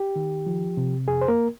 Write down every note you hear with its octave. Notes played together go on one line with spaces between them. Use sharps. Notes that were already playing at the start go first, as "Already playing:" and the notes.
Already playing: G4
D#3
F3
C3
F2 G#4
C5
A#3 A#4